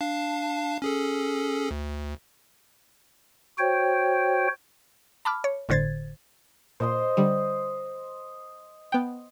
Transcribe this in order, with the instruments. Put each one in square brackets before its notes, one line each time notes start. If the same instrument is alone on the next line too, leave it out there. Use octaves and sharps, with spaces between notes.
[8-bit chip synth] D4 F5 A5
C#4 G#4 A4
D2
[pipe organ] F#4 C5 C#5 G5
[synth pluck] A5 B5 D6 F6
C#5
G1 A2 D3 C5 G#6 A6
[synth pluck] A#2 [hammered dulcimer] C5 D#5 C6
[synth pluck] D3 G3
B3 G5